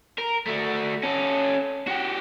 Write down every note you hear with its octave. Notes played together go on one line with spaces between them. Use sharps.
A#4
A3 F#4
C#4 A4
F#4 G4